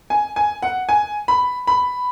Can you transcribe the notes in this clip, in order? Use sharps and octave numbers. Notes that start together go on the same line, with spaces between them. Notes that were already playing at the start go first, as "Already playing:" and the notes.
G#5
G#5
F#5
G#5
B5
B5